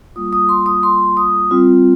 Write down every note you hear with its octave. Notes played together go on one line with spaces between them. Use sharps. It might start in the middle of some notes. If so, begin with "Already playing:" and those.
G3 A#3 F4 D#6
D#6
C6
D#6
C6
D#6
G3 C4 F4